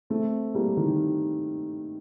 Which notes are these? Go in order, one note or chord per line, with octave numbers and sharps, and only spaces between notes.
A3 C4
G3 A#3
D#3